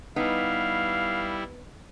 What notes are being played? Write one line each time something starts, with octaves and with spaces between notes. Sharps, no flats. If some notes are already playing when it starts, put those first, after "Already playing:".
G3 B3 D#4 E4 B4 F5